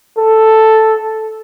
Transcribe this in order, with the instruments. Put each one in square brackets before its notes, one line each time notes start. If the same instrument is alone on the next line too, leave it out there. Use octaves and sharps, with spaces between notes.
[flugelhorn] A4